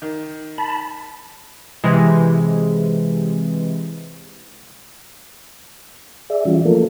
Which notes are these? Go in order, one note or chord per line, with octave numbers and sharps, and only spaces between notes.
D#3
A5 B5
C3 E3 G#3
G#4 D5 E5
E3 G3 C#4 F4 F#4
F3 A3 A#3 F4 A4 A#4